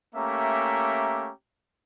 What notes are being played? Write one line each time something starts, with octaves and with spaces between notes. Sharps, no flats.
A3 A#3 C#4 G4 E5 A#5